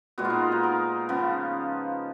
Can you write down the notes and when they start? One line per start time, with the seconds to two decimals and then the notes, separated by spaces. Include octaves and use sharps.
0.18 A#2 G#3 B3 F#4
0.25 F4
0.30 D#4
0.52 D#4
0.63 A#4
1.09 C#3 F3 B3